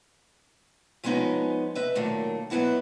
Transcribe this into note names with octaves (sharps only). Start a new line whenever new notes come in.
F3 G#3 B3 C#4 D#4
B4 D#5 E5
A#2 D#3 F#3 A3 A#3
G#2 F#3 B3 E4 F#4